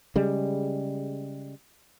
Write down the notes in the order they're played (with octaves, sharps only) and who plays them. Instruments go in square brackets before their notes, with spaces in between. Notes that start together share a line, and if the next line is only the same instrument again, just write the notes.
[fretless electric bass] C#3 G3 G#3